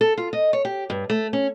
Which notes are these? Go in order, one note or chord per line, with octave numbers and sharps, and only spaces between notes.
A4
F4
D#5
C#5
G4
G2
A3
C#4